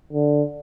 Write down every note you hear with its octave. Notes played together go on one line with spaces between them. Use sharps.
D3